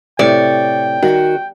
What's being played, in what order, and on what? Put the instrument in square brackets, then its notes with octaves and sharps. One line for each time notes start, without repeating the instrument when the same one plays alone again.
[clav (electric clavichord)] A2 C3 [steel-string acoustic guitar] C#5 [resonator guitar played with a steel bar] D5 [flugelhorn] G5
[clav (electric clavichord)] D#3 [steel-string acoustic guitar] F#4